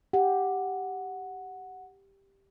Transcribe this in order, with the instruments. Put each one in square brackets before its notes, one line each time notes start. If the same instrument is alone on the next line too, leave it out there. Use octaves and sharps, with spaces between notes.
[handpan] G4 [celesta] F#5